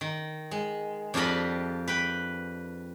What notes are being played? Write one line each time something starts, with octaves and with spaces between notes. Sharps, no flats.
D#3
G#3
F2 D4 F4 G4 D#5 B5
B4 G5